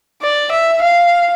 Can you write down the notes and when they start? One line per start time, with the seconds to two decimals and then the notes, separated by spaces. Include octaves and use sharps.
0.22 D5
0.51 E5
0.83 F5